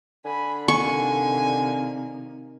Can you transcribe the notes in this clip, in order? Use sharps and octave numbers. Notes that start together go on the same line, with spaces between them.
D3 G#5 B5
C3 D#3 A#3 G#5 C#6